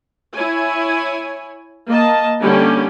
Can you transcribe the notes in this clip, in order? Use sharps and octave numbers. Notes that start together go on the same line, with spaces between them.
E4 C#5 G#5
A#3 D#5 A5
D3 G3 A#3 C#4 G4